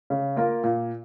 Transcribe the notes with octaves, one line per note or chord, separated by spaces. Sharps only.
C#3
A#3 F4 A#4
A#2